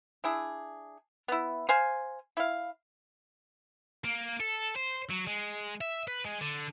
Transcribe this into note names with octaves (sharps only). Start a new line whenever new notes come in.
D4 E4 G#4
B3 E4
C5 F5 G#5
E4 F5
A#3
A4
C5
F#3
G#3
E5
B4
G#3
D3